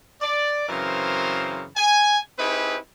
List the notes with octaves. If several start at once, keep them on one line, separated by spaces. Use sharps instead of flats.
D5
F#2 C#3 E3 C4 A#4 C5
G#5
C4 D#4 E4 G4 G#4 B4